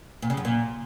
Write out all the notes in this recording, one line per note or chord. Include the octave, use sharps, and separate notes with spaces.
A#2
C#3
F#2
A#2